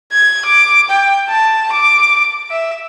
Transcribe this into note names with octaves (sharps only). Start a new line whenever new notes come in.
G#6
D6
G5
A5
D6
E5